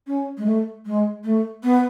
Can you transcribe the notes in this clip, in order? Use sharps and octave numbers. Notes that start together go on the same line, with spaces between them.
C#4
G#3
A3
G#3
A3
B3